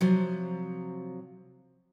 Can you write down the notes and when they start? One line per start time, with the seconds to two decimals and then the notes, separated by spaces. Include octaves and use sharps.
0.01 C3 F3 F#3